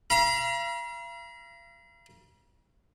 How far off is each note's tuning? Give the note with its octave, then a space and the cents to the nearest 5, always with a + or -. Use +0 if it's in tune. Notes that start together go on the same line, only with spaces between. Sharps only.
F5 -40 A#5 +45